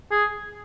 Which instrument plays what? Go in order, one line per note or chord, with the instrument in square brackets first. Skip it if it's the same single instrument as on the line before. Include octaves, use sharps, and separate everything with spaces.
[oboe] G#4